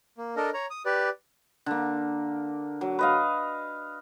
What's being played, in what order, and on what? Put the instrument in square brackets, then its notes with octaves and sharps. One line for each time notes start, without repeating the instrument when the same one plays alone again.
[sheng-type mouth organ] A#3
D4 A4 A#4 D#5
C#5 A#5
D#6
G4 B4 D5
[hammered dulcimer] D3 A#3
F#3
B4 D#5 F5